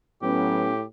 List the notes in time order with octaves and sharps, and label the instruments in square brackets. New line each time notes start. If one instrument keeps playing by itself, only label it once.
[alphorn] A2 [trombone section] F#3 B3 [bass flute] C#4 [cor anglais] G4